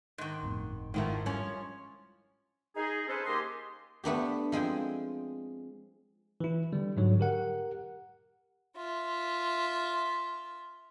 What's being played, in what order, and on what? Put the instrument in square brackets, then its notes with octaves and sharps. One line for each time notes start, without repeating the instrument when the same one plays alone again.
[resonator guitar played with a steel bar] G#2 D#3
[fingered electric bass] G1 F2 A2
[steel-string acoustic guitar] G#2 E4 A#4 [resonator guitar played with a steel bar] D#3 F3 A3
[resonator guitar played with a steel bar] F3 C#4 [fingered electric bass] G3
[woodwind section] D#4 G#4
C4 C#4 G#4 A4 B4 C5
D#3 A#3 G4 G#4 D#5 C6
[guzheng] A3 B3 D4 G4
F3 G#3 C4 G#4 G5
[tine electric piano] E3 E4
D3 G3
G#2 D3 F#3 C#5
G4 A#4 F#5
[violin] F4 E5